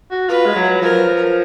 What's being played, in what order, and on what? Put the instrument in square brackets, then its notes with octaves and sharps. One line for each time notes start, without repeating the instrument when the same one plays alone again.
[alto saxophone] F#4
[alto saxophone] F4 [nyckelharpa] B4
[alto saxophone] G#3
F#3
[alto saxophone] F3 [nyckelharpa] A#4